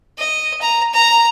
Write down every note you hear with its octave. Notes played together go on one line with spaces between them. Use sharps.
D#5
A#5
A#5